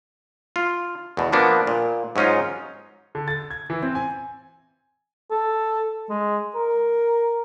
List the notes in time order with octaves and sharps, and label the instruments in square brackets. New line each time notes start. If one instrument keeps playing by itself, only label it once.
[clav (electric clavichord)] F4
E2 B2
F3 A#3 B3 D4
A#2
G#2 F#3 C#4 D#4 F4
[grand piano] D3
A6
G#6
E3
C4
G#5
[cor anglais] A4
G#3
A#4